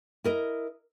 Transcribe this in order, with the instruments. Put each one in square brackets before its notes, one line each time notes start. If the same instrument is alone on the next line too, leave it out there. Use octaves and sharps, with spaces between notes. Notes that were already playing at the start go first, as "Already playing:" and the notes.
[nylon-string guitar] E4 A#4 D#5